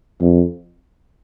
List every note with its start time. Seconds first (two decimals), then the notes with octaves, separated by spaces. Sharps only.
0.21 F2